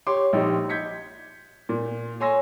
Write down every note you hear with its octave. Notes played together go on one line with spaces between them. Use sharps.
G4 C#5 C6 D6
A#1 D#4 G4
G6 G#6 B6 C#7
A#2
C#5 G#5 C6 E6 A#6